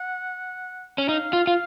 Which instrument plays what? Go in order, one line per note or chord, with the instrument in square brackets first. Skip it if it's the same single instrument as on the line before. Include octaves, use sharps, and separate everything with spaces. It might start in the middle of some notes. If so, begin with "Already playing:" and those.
Already playing: [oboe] F#5
[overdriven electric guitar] C#4
[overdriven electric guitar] D#4 [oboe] F5
[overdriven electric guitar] F4
F4